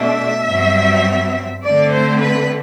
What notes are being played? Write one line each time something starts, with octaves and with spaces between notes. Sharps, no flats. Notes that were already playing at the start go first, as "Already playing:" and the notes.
Already playing: B2 A3 D4 E5
G2 F#3 C4
D3 A3 C4 D5
C5
B4